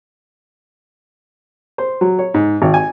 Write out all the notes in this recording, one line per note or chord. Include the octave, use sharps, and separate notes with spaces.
C5
F#3
C#5
G#2
G#1
G#5